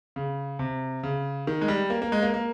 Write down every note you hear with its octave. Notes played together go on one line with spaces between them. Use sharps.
C#3
C3
C#3
D#3
G#3
G3
A#3
A#3
G#3
A#3
A#3